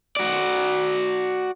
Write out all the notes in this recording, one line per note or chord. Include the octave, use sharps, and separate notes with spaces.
F#4 D5